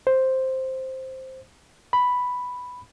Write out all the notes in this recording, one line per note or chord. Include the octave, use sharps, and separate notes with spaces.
C5
B5